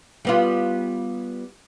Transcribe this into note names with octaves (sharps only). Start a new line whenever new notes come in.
G3 B3 F4